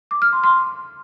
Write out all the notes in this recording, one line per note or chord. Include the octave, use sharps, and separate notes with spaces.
D6
F6
C6
C6